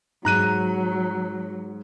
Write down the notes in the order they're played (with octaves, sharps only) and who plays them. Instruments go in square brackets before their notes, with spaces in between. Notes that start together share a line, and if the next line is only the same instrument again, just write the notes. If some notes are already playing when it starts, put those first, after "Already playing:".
[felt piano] G#2 [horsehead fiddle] F#3 [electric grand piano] A#5 F#6 D#7